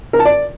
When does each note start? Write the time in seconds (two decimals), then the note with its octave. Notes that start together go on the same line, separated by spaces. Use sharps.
0.13 A#4
0.19 A5
0.25 D5